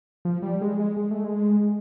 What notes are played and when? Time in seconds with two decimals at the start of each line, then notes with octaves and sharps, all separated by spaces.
0.25 F3
0.42 G3
0.61 G#3
0.80 G#3
0.97 G#3
1.11 A3
1.24 G#3